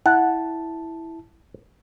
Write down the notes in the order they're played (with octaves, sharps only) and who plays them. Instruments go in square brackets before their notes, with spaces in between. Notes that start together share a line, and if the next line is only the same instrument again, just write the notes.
[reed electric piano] E4 A5 [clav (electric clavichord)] F#5